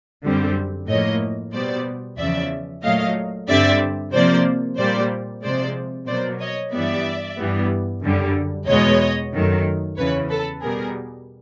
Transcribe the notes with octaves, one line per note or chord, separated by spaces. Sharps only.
F#2 D3 G3 C4
A2 F3 A#3 C#5 D#5
B2 G3 B3 C5 D5
E2 C#3 F3 D5 E5
A#2 F#3 A3 D#5 F5
G2 D3 G3 C4 D5 E5
C3 F3 A#3 C5 D5
A#2 G3 A#3 C5 D5
C3 F3 G#3 C5 D5
B2 F#3 A#3 C5 D5
C#5 D#5
G2 E3 G3 B3 D5 E5
G2 E3 G3 B3
F#2 D3 G3
E2 B2 G#3 B3 C#5 D#5
F#2 D#3 F#3 A3
E2 C#3 E3 B4 C#5
A4 B4
B2 G3 B3 G#4 A#4